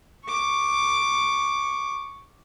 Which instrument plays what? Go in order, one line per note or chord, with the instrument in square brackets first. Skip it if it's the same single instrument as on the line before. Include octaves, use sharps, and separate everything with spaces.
[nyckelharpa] C#6 D6